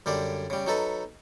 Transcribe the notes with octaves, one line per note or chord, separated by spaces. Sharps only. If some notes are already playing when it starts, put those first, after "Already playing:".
F#2 D3 G3 D5
C#3 G3
F#3 D#4 A4 B4